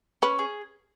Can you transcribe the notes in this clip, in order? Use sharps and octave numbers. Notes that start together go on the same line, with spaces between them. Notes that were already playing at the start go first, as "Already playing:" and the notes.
C#4 B4
G#4